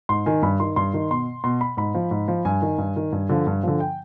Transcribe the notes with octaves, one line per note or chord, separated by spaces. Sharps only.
G#2 C6
D#3 G#5
G2 B5
D#3 C6
G2 C6
D#3
B2 C6
B2 C6
B5
G#2 B5
F3
G#2
F3
G2 G#5
D#3
G2
D#3
G2
D3 F3
G2
D3 F3
G5